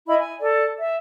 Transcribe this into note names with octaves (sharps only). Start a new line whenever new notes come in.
E4 D#5 B5
G#5
A4 D5
E5